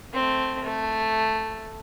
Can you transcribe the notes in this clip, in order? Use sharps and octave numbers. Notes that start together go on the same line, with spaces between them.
A3 C4
A3